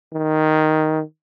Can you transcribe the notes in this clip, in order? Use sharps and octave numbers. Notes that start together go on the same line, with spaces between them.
D#3